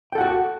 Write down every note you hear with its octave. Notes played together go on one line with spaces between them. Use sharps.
F#4 A4 F#5 G5